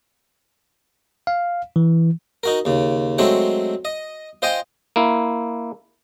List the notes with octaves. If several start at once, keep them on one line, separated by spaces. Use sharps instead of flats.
F5
E3
D#4 F#4 A#4
D#2 C#3
F#3 G#3 A3 C4 F#4 C#5
D#5
F4 C5 D#5 G5 G#5
A#3 E4